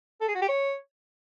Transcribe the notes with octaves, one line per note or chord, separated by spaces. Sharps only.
A4
G#4
F#4
G4
C#5